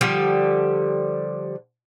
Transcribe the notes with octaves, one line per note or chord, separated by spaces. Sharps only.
D3 F3 G3 G4